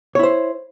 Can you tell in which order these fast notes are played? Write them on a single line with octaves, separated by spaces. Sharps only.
C#5 E4 C5